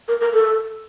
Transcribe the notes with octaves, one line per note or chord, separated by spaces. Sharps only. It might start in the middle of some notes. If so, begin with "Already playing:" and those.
A#4
A#4
A4